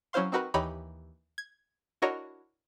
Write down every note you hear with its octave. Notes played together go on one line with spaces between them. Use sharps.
F#3 C#4 E4 C5 F5 C6
C4 D#4 F#4 A#4 B4
D#2 E3 D#4 G4 C#5 B5
G#6
D4 E4 F#4 A#4 C#5 D#5